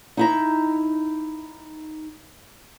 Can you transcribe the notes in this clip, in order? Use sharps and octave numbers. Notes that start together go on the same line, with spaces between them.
D#4 E4 A#5